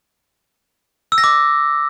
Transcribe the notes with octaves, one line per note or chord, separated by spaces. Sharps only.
E6
A#6
D6